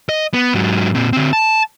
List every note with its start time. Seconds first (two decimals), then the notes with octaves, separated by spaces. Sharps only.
0.09 D#5
0.34 B3
0.54 G#2 F#3
0.95 A#2 C4
1.13 D3 C4
1.33 A5